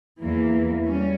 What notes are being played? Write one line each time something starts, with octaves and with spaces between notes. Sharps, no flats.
E2 E3 A#3
G3 C#4